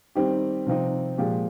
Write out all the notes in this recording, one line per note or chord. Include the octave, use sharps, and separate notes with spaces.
D#3 G3 C4 D#4 G4
C3 F3 C4 D#4
A#2 F3 G#3 G4